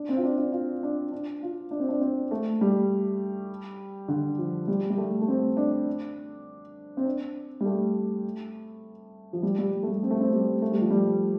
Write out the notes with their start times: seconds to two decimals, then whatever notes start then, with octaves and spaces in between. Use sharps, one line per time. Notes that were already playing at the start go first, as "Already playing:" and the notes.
Already playing: D4
0.09 C4
0.17 F4
0.24 D4
0.38 D4
0.52 F4
0.83 D4
1.12 D4
1.42 F4
1.71 D4
1.80 C4
1.89 D4
2.01 C4
2.31 A3
2.61 G3
4.08 D3
4.38 F3
4.68 G3
4.90 G3
4.98 A3
5.21 A3
5.28 C4
5.57 D4
6.97 C4
7.05 D4
7.60 G3
7.66 A3
9.33 F3
9.43 G3
9.58 G3
9.83 A3
9.87 G3
10.03 C4
10.11 A3
10.21 C4
10.33 G3
10.62 A3
10.72 G3
10.81 F3
10.90 G3